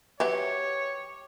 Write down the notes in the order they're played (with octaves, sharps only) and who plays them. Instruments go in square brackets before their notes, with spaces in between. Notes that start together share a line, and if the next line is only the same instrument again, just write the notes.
[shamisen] F#3 B4 E5 [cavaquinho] G4 [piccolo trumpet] C#5